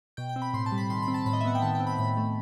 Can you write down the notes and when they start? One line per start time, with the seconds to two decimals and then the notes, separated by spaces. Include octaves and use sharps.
0.17 B2 G5
0.29 G5
0.36 C4
0.42 B5
0.53 A2 C6
0.66 A5
0.72 G3
0.78 B5
0.90 D#3 C6
1.02 B5
1.08 C4
1.14 A5
1.26 A2 B5
1.33 D#5
1.41 E5
1.45 B3 F#5
1.55 G5
1.62 D#3 A5
1.75 G5
1.80 C4
1.87 B5
1.98 A2 B5
2.17 A3